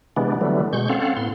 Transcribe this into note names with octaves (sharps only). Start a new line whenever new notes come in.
C3 E3 G#3 B3 D4
D3 E3 F#3 G3 A3 B3
B2 G#3 C#6 G6
C4 C#4 A4 F5 F#5
A2 B3 C6